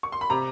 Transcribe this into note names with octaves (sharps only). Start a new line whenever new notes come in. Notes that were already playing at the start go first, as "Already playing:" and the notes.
C#6
C6
B5
C3 A#5